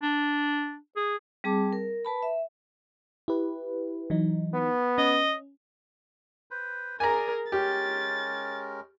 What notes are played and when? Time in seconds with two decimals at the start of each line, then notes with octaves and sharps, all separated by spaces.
0.03 D4
0.96 G#4
1.44 G3 C4 G#4 A5 D6
1.73 A#4
2.05 B4 A5 B5
2.22 E5
3.28 E4 G4 B4
4.10 E3 F#3 D#4
4.54 B3
4.98 C#4 D#5
6.51 B4 C5
7.00 G#4 A#4 D5 G#5 A#5
7.52 G#3 C#4 G4 A#4 A6